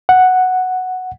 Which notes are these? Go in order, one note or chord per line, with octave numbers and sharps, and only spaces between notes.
F#5